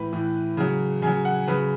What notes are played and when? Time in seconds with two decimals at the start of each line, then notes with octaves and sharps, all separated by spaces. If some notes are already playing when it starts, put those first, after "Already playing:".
Already playing: A2 E3 B4
0.13 A2 E3
0.57 C#3 F#3
1.02 C#3 G#5
1.07 F#3
1.25 F#5
1.47 C#3 F#3 B4